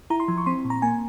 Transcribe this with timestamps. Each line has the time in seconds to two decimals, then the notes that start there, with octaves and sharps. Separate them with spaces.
0.10 E4 A#5
0.20 C6
0.28 F3
0.38 C#6
0.46 C4 C6
0.65 A#2
0.70 A#5
0.82 A#3 G#5